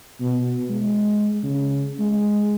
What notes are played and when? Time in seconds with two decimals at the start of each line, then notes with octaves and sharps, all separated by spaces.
0.21 B2
0.70 G#3
1.43 C#3
2.00 G#3